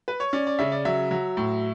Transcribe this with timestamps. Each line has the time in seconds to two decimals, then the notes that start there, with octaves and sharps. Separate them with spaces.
0.08 B4
0.20 C#5
0.33 C#4 D5
0.47 D5
0.59 C#3 E5
0.72 D5
0.85 F#3 E5
1.11 F#3
1.37 A2